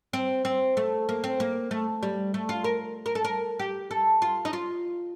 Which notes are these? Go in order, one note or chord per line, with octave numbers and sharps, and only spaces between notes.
C4
C4
A3
A#3
C4
A#3
A3
G3
A3
F4
A#4
A#4
A4
A#4
G4
A4
F4
D#4
F4